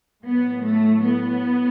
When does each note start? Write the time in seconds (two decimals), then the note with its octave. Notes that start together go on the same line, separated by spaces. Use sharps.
0.25 A2 F#3 B3
0.64 A3
1.03 B3